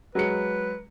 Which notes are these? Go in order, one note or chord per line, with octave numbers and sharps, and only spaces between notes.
F#3 G#3 B4 C#7